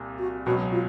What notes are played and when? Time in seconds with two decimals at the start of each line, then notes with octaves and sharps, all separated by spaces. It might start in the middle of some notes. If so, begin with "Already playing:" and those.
Already playing: C2 A#2
0.19 F#4
0.46 C#2 B2 F#3 F#4
0.72 F4